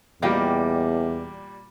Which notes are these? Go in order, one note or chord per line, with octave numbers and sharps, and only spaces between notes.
E2 A#2 G3 D#5 F5 G5